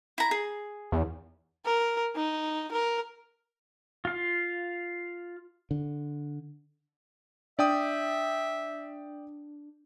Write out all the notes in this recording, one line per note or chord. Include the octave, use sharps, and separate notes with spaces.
E4 A#5
G#4
E2
A#4
D#4
A#4
F4 F5
D3
D4 D5 E5 G5 D#6